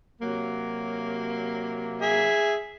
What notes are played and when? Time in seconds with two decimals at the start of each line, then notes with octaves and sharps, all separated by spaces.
0.21 C3 F#3 A#3
2.02 G#4 E5